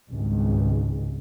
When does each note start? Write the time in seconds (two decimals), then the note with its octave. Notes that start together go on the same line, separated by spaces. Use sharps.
0.10 G#1 C#2 G2